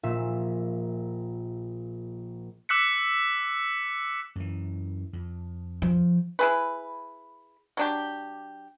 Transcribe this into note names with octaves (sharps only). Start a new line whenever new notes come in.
A#1 A#2 E5
D6 E6 F#6 B6 C#7
F#2 E3
F2
F3
E4 G#4 B4
F#3 D4 G4